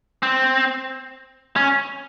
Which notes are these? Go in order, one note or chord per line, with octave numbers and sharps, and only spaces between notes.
C4
C#4